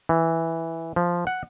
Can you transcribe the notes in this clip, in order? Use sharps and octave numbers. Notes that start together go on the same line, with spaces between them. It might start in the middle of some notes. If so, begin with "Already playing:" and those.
E3
F3
F#5